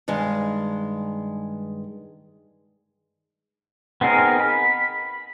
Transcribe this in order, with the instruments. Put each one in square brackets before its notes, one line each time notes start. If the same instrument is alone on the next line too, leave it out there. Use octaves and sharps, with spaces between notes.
[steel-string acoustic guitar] G2 D#3 G#3
[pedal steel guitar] B3 C4 D#4 G#4 A#4
B5